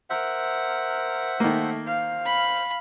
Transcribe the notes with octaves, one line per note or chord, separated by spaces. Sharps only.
A#4 C5 E5 F#5
D#3 A3 A#3
C5 F5
B5